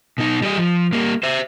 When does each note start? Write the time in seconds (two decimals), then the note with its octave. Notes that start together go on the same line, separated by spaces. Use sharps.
0.18 B2 D#4
0.42 G3 D#5
0.57 F3
0.93 G3 A#3
1.23 C5 E5